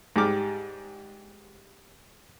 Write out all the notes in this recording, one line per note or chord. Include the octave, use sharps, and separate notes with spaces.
G#2 G3 G4 D6 F6